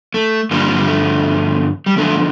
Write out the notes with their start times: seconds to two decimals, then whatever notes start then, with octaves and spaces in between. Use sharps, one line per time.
0.14 A3
0.51 G2 D3 F3 G3 A#3
0.76 G3
0.87 A3
1.86 G3
1.96 E2 D3 F3 A3